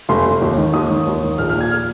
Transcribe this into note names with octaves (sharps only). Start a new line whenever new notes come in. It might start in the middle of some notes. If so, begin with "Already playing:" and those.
F1 C6
F1
D#2
D#3
D#2 D#6
D#3
D#2
D#3
A#1 F6
F6
A#2
G#6
F6